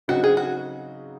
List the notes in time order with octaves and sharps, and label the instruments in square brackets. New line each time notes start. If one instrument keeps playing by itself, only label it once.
[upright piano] C#3 F#3 C4 D#4 [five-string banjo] F#4
[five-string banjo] G#4
F#4